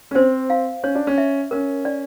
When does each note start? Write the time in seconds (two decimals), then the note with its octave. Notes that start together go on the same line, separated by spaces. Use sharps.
0.11 C#4
0.15 C4 C5
0.50 F5
0.83 C#4 C#5
0.95 D4
1.07 C#4
1.18 E5
1.51 C#4 A#4
1.85 D5